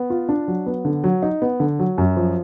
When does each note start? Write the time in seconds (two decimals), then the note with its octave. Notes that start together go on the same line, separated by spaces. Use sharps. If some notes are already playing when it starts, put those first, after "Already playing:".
Already playing: B3
0.10 F4
0.29 D4
0.48 F#3
0.67 B3
0.85 D3
1.04 F#3
1.23 D#4
1.42 B3
1.60 D3
1.79 F#3
1.98 F#2
2.17 F3